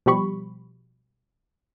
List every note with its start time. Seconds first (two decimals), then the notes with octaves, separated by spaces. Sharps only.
0.06 B2 F3 G3 G4 B5 C#6